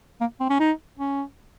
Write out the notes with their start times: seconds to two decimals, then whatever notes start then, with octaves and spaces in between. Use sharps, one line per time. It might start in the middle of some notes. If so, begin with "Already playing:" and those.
0.21 A#3
0.40 C4
0.50 C#4
0.60 D#4
0.99 C#4